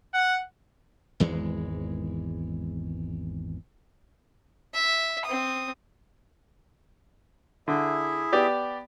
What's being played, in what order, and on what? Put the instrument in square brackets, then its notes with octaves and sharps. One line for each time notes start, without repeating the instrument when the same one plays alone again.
[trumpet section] F#5
[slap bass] G#1 E2 E3 G#3
[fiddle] E5
C4 D#6
[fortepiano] D3 [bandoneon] E4 G#4 E5
[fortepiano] B3 G4 D5